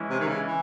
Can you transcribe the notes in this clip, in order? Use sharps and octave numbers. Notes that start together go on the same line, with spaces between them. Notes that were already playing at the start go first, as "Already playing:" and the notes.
Already playing: E3 G#3 C#4 E4
C3
D#3
C#3
E3